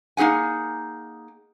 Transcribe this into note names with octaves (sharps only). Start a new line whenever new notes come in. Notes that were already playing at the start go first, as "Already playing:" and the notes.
A#3 D#4 G#4 F#5 G#5